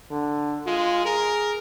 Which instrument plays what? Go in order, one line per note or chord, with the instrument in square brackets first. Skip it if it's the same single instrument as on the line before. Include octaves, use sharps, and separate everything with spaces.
[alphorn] D3
[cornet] G#3 [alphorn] F4
[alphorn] G#4 [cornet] A#4